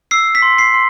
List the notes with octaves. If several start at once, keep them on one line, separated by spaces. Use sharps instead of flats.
E6 C7
B6
C6
C7
C6